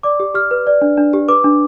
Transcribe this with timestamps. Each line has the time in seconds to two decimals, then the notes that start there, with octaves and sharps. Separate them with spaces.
0.03 D5 D6
0.20 G4
0.34 G4 F6
0.51 B4
0.67 D5
0.82 D4
0.97 D4
1.13 G4
1.28 B4 D6
1.44 D4